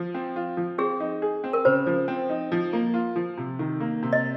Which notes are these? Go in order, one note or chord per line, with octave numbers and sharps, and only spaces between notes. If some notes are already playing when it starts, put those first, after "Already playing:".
Already playing: F3
C4
F4
F3
C4 G#4
D#4
G#4
C4
A#4
C#3 C5
F3
C4
D#4
F3
A#3
F4
F3
C3
D#3
A#3
C3
D#5